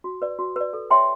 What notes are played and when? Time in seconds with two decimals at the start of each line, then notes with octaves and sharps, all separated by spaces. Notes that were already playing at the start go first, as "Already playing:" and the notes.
0.04 F#4
0.22 B4 D5
0.39 F#4
0.56 B4 D5
0.73 A4
0.90 C#5 E5 G5 C6